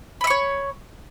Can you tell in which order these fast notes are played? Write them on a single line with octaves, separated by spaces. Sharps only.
B5 E5 C#6 C#5